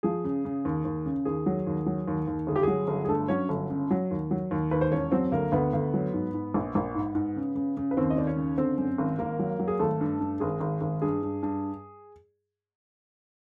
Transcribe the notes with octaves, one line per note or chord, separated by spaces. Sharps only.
F3 G#4
C#3
C#3
D#2
D#2
C#3
D#2 G#4
F#3
D#2
F#3
D#2
D#2
G1 G#4
G4
F#3 G#4
G1
G#4
G2 A3 A4
F#3 C#4 C#5
G1
C#3
F#3
D#2
F#3
D#2
D#2 B4
C5
E1 C#4 C#5
F#3 C4 C5
D2 A#3 A#4
D2 B3 B4
D2
F#3
G#2
G#2
A#1
A#1
G#2
G#2
C#3
C#3
C#3
B4
D#2 C4 C5
D#5
D#2 D5
C#4 C#5
C#3
D3 C4 C5
F#2
G#1
G#1 A#3 A#4
F#3
F#3
G#4
G#1 A3 A4
G2
G2
G#1 G#4
G#1
G#1
G2 G#4
G2
G2